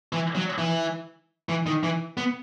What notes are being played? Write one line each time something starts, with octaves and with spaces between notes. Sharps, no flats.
E3
F#3
E3
E3
D#3
E3
B3